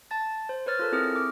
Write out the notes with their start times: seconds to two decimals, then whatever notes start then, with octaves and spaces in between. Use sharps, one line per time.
0.11 A5 A6
0.49 C5
0.66 B4 C#5 F6 A6
0.79 F4 A4 A#4
0.92 C4 E4 G#4 F6
1.15 D6